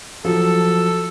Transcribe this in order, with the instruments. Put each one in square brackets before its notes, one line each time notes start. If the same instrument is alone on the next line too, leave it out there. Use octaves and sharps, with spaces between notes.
[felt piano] F3 F#3 [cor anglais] A4